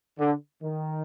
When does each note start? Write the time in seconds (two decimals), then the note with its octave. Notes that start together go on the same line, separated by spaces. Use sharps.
0.18 D3
0.62 D#3